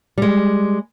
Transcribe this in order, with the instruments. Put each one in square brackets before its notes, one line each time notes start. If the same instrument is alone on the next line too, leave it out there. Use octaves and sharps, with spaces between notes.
[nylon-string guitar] G3 G#3